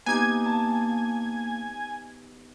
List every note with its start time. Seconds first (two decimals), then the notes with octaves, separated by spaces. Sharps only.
0.06 A#3 B3 D#4 G4 G#5 G#6
0.46 A5